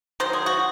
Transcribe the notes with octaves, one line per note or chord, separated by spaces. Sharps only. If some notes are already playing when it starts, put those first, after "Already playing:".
D#3 F#3 C5
G#4
F#4